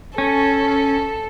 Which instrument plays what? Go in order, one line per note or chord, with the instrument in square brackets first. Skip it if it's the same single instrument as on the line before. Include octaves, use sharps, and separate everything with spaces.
[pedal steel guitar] C#4 [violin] A4